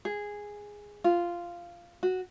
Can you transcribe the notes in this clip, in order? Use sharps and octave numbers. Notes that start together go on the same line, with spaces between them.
G#4
F4
F#4